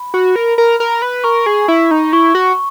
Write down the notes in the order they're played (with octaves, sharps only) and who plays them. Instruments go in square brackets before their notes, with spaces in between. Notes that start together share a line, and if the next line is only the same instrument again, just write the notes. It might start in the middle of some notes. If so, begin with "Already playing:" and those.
Already playing: [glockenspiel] B5
[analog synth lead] F#4
A#4
A#4
A#4
B4
[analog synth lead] A#4 [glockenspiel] C#6
[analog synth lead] G#4
E4
D#4
[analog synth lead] E4 [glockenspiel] C#6
[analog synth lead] F#4